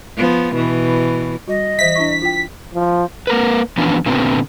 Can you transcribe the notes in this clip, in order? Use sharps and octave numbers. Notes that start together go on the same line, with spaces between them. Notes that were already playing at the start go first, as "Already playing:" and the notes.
F3 B3
B2 E3
G3 F#4 D#5
E3 C5 E5 B6
D4 E4 C#6
F4 G5
F3
A#3 A#4 B4
E3 F3 B3 C#4 D4
A#2 D3 B3 C4